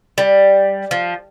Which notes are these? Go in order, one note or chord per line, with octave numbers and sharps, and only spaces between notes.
G3
F3